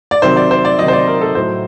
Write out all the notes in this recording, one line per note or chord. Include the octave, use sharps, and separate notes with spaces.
D5
C3 D#3 F#3 C5
D5
C5
D5
C3 D#3 F#3 D#5
C5
D5
A#4
A4
A2 F#3 C5